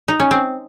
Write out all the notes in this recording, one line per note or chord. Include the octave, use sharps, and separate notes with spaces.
D#4
C#4
C4